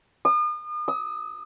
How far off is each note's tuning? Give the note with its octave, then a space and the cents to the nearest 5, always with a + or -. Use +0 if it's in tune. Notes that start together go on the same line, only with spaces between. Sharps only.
D#6 -40
D#6 +40